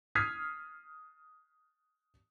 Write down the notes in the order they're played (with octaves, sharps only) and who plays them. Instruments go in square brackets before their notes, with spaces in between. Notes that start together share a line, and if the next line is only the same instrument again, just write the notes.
[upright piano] D#6 F6 G#6 B6 C7